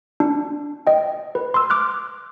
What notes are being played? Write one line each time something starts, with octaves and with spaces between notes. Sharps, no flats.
D4
D#5 G5
B4
C6 E6
D6 F6 F#6